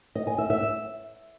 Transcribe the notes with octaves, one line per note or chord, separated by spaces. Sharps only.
D#5
G#5
E5
E5